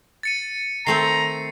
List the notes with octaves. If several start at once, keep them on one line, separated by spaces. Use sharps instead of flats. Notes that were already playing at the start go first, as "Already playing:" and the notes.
A6 C#7 D#7
D#3 A3 C4 A#5 C7